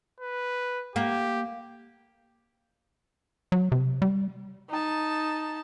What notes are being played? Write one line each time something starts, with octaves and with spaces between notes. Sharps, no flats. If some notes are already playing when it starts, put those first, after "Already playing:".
B4
A#3 G4
F#3
C3
G3
D#4 A5